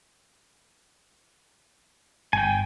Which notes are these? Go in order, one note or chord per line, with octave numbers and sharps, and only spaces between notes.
G1 G5 G#5